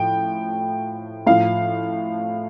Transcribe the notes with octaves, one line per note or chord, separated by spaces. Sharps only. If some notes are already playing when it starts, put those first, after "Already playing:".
Already playing: A2 F3 G5
A2 F3 F5